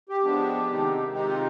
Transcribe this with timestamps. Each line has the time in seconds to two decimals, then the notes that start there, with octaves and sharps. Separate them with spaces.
0.09 G4
0.24 F3 G#3 B3 D4
0.69 C3 D#3 G#3 C4 D#4
1.13 C3 D#3 G#3 C4 D#4 G4
1.28 F4